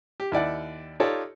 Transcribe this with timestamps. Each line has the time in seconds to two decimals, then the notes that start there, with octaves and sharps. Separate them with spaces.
0.20 G4
0.32 D#2 E4 D5 F#5
1.00 D#4 F4 G4 A4 C#5 D5